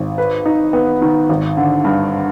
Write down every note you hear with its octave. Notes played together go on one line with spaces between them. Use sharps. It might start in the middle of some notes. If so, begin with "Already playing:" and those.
Already playing: G#1
B4
D#4
B3
D#3
G#1
D3
G2